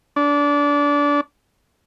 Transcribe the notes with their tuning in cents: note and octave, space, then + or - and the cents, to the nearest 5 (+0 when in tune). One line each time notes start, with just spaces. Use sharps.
D4 -25